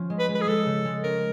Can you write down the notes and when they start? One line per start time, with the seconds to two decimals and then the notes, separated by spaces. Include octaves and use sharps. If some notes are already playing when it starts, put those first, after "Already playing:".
Already playing: F3 C#4
0.10 G#3
0.19 B4
0.29 G#3
0.35 B4
0.41 G#4
0.47 G#3 A4
0.66 C#3
0.85 G#3
1.04 C#4 A#4